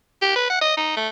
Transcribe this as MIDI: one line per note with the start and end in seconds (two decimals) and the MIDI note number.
0.22 0.33 67
0.36 0.45 71
0.50 0.58 78
0.61 0.75 75
0.77 0.96 63
0.97 1.08 57